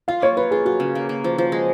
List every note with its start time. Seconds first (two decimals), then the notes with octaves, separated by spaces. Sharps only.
0.08 F4 F5
0.22 A#3 C#5
0.37 F4 B4
0.51 F4 G#4
0.65 F4 F#4
0.80 C#3
0.95 A#3
1.09 A#3
1.24 F3
1.38 F3
1.52 G#3